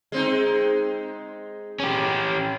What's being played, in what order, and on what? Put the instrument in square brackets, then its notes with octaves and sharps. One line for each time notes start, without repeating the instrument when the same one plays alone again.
[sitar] G#3 C4 D#4
[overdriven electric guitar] C#4 G4